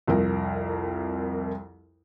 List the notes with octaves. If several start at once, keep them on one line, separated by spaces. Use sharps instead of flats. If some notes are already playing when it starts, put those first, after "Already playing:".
C2 F2 A#4